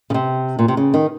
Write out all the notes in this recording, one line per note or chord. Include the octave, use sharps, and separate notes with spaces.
C#3
C3
A#2
C3
C#3
D#3